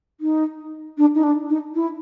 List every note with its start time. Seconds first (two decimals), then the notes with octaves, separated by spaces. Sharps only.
0.21 D#4
0.98 D4
1.15 D#4
1.23 D4
1.49 D#4
1.75 E4